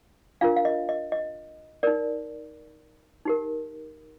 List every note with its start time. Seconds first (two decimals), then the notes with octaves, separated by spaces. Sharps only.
0.41 D4 F4 A#4 F5
0.57 F5
0.65 D#5
0.89 D#5
1.12 D#5
1.83 D#4 A#4 D5
3.25 D#4 G4 A#4